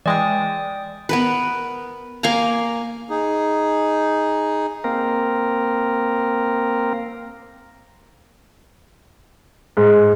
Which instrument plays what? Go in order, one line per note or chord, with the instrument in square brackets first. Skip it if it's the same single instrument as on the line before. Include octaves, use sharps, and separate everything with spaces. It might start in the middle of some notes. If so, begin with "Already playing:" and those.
[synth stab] E3 G#3 [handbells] D5 G5 D#6
[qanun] B3 A#4 B4
A#3 F5 G#5 A#5
[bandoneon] D#4 G#4
[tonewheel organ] A#3 C4 A#4
[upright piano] G#2